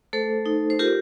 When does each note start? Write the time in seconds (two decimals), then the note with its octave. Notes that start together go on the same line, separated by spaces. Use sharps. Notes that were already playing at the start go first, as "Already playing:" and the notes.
0.13 A3 A4 C5
0.46 D#4
0.70 C5
0.79 F4 G4 A#4